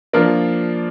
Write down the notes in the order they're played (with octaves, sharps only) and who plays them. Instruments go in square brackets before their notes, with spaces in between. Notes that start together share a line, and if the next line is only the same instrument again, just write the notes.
[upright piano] F3 A#3 D4 F4 A#4